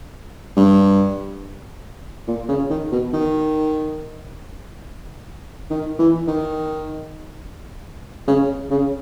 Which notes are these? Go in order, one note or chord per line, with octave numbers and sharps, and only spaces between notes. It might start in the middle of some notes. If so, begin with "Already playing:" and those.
G2
A#2
C#3
D#3
B2
D#3
D#3
E3
D#3
C#3
C#3